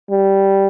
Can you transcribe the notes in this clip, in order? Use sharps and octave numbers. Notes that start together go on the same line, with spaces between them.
G3